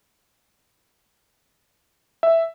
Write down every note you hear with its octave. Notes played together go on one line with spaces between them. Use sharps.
E5